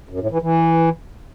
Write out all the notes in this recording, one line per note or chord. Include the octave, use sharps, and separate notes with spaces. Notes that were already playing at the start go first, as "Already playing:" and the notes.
F#2
A2
E3
E3